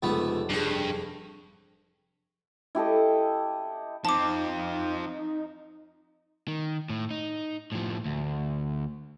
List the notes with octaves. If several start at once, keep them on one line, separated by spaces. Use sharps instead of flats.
F1 C#2 A3 B3
G2 C#4 G#4
E4 G4 A4 D#5
F3 C4 D#4 A5 D6
D#3
A2
D#4
A2 F3
D2